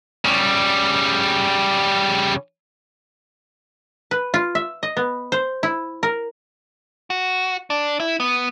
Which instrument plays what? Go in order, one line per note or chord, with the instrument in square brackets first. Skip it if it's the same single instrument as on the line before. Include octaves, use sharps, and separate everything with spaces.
[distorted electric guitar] C#3 G3
[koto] B4
F4
E5
D#5
B3
C5
E4
A#4
[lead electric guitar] F#4
D4
E4
B3